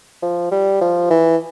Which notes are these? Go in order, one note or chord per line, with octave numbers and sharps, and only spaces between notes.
F3
G3
F3
E3